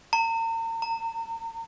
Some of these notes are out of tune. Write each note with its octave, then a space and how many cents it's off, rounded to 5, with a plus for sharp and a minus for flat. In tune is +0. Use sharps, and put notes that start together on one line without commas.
A#5 -40
A#5 -30